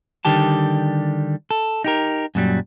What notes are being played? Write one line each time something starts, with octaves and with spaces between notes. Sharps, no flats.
D3 D#3 G3 G4 A5
A4
D#4 G4 A#4
F#2 A#2 F#3 G3